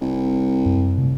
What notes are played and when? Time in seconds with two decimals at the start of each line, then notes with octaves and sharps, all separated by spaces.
0.01 C2
0.65 F#2
0.98 C3 A3